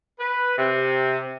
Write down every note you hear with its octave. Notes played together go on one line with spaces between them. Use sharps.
B4
C3